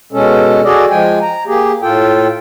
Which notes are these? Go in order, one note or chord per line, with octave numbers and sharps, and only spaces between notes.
B2 G#3 C#4 A4
F#4 G#4 A4 D5 D#5
F3 G#3 G5 G#5
A#5
A#3 G4 G#4
A2 F4 A4 G5